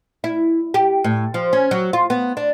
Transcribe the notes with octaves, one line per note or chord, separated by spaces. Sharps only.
E4
G4
A2
F3
C#4
F#3
F4
B3
D4